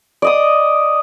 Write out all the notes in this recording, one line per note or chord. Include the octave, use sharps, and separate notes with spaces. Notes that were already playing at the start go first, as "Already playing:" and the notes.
D5 D#5 D#6